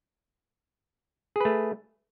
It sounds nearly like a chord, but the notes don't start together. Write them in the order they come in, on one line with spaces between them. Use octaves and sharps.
G#4 B4 A3